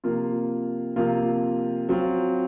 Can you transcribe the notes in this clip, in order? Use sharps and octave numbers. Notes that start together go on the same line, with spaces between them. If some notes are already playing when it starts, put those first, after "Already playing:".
C3 F3 A#3 F4
C3 F3 A#3 F4
F#3 C4 F4